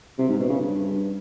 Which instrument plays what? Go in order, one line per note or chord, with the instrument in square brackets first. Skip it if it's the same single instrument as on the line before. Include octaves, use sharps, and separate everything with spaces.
[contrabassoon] C3
G#2
B2
C#3
G2